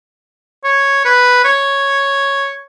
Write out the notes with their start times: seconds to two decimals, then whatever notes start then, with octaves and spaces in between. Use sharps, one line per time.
0.64 C#5
1.05 B4
1.45 C#5